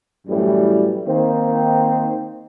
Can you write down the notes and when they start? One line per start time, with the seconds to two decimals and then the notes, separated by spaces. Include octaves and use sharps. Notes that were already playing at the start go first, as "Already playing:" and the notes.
0.27 F#2 A2 E3 G3
1.06 D#3 A#3 C4